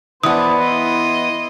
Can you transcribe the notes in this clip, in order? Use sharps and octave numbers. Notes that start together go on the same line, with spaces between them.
E3 B3 C5 D5 A5 D#6
E4 D#5 C6